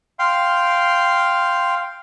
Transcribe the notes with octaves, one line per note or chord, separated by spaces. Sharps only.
F5 G5 C6